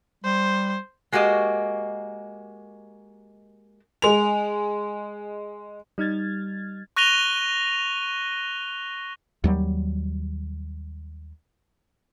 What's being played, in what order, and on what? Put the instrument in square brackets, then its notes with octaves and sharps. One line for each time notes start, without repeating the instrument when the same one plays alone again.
[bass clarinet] G3 [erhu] C5
[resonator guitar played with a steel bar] G#3 A#3 F#4 G4 D#5
[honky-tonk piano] G#3 F7
[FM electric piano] G3 D#4 F6 G#6 A6
[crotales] C#6 F#6 A#6 D#7 F7 G7
[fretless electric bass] D#2 F#3 G3